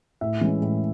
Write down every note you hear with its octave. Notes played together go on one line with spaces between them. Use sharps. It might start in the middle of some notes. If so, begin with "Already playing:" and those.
A2 E5
E3 G#3 C#4
A2